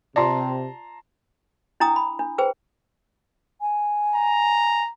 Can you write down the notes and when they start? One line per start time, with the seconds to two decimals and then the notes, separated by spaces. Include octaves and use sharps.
0.16 C3 F4 D5 A5 A#5 C6
1.80 D4 E4 G5 A#5 D#6
1.96 B5
2.19 D4
2.38 G#4 B4 C5 G5
3.61 G#5
4.15 A#5